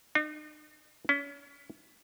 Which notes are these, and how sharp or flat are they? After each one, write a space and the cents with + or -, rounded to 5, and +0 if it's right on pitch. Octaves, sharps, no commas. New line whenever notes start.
D#4 -45
C#4 +35